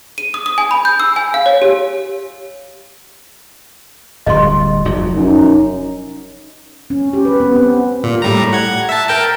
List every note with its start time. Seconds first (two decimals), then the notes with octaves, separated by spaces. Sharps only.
0.18 D#7
0.34 D#6
0.46 D#6
0.58 G#5
0.71 B5
0.85 G6
1.00 E6
1.16 G#5
1.34 F5
1.46 C#5
1.62 G4
4.26 D1 G3 D#5 C6
4.85 F1 F#3
5.14 F#2 D#4
6.90 C#4
7.13 G4
7.25 B4
7.40 B3
7.56 C4
8.04 A#2
8.22 A2 G3 A#5
8.53 F#5 G#6
8.89 E5 A5
9.09 A#4 G5 A5